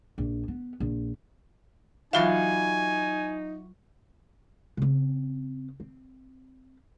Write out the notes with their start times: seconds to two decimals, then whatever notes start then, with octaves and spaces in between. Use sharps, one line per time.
0.18 A#1
0.48 B3
0.80 A#1
2.13 E3 F#3 D#4 F4 F#4 E5 F5 G#5
4.77 C#3 C4
5.80 C4